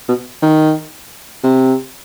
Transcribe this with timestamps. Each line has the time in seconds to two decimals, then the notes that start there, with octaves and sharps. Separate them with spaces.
0.08 B2
0.42 D#3
1.43 C3